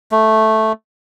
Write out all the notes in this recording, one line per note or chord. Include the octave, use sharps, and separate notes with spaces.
A3